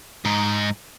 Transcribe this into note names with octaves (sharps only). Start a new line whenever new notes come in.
G#2 D#4